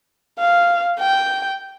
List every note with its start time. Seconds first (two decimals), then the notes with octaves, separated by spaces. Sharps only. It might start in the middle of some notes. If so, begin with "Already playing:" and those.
0.39 F5
1.00 G5